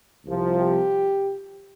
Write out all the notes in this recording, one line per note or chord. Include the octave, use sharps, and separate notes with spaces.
C2 C3 F3
G4